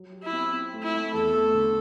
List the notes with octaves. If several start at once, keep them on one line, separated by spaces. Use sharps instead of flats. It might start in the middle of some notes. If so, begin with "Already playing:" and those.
Already playing: F#3
G4
E4
C4
C4
A3
E4
A3
E2 A4
A3
D3